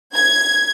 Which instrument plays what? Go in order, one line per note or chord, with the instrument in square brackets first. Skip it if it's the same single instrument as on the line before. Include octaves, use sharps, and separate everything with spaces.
[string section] G#6